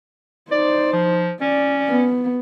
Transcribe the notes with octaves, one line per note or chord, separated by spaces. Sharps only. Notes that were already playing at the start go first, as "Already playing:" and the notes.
D#4 C5 D5
F3
C#4 D5
B3